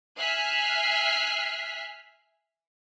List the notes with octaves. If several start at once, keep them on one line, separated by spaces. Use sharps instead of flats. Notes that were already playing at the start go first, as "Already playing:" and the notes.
E5 G#5 F6 F#6 B6 C7